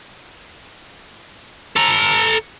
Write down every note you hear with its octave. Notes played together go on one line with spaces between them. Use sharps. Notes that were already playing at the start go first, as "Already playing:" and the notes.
A4 A#5